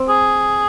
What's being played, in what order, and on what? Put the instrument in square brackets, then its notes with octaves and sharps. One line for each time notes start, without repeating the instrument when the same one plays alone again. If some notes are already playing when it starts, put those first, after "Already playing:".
Already playing: [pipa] C4
[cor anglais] G#4